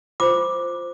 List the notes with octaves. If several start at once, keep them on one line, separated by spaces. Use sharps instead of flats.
F4 C5 D6